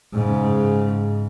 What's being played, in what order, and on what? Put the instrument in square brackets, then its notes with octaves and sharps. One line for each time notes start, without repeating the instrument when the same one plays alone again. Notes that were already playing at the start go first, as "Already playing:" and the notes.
[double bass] G#2 C#3